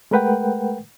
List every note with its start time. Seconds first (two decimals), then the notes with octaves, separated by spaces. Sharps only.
0.11 G#3 A3 A#4 B4 F#5 G5